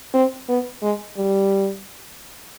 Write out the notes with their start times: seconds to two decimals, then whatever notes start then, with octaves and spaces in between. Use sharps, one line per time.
0.14 C4
0.48 B3
0.82 G#3
1.17 G3